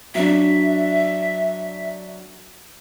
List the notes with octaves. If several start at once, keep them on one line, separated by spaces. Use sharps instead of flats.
F#3 D4 E5